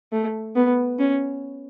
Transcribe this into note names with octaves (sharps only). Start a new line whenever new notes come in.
A3
B3
C#4